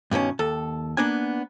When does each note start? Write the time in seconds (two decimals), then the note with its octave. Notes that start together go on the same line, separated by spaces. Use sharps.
0.11 G2 B2 D#3 C#4
0.39 D#2 A4
0.97 A#3 B3 D4 G#5